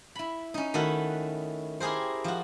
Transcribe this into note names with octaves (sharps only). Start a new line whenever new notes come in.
E4 B5
C#4 D#4
D#3 A3 E4 F#4 A4 B4
E4 G4 G#4 A#4 C5
F3 F#4